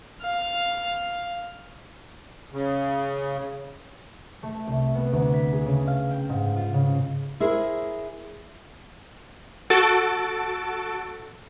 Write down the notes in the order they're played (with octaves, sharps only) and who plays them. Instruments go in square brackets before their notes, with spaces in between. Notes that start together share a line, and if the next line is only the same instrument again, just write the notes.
[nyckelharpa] F5
[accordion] C#3
[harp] A3
C2
B3
D2
B6
G#4
C#3
F5
G5
G#2
F4
C#3
[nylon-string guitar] E4 G#4 A#4 C5
[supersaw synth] F#4 A4 A6 D7